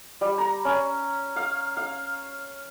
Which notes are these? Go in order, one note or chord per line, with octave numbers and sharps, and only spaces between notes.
G3
A#5
C#4
F5
F5